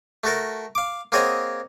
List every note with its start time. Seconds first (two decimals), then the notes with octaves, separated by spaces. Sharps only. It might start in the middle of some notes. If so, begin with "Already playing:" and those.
0.24 A3 F#4 A4 A#4
0.75 F5 D6
1.12 A#3 C4 G#4 C#5 D#5 F#5